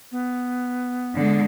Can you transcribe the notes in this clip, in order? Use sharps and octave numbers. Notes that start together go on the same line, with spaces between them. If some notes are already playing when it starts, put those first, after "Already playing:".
B3
D3 G#3